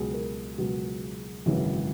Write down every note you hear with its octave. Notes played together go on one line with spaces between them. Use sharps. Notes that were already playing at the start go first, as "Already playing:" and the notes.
Already playing: C#2 B2 F#3 G#4
A#4
C#2 B2 F#3
G#1 F#2 C#3 E3